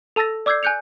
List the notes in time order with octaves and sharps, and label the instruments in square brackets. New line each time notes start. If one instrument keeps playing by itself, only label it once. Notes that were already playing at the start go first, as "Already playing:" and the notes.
[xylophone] A4 A5 E6 A6 A#6
D5 D6 E6 G6 G#6 C7
G#5 F#6 G6 C#7 F7